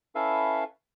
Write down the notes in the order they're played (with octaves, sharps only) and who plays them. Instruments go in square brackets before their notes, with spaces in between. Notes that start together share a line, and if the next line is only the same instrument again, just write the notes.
[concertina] C#4 E4 A4 B4 E5 F5